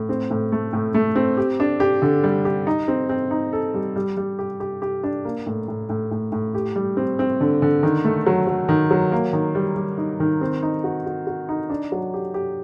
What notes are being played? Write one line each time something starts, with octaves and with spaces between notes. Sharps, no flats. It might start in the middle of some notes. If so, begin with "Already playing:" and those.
Already playing: A2
C4
A2
A3
A2
A3
C4
G4
D4
G4
D3
G3
G4
D#4
C4
C4
D#4
A4
G3
G3
G3
G4
G4
G4
D4
A#3
A2
A2
A2
A2
A2
G4
G3
C4
C4
D3
D3
D#3
A3
F#3
F#3
D#3
F#3
A#3
D#3
G3
G3
D#4
D#3
C4
D#4
F#4
F#4
F#4
D#4
D4
F#3
G4
G4